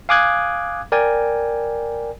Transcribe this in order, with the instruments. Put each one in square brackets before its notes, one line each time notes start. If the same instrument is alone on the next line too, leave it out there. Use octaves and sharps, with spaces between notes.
[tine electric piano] F5 G#5 D6 D#6 F#6 G#6
A#4 D5 G5 G#5